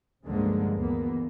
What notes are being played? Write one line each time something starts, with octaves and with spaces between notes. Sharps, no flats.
C#2 G2 D3 F3 G#3 A#3
D2 E3 A#3 B3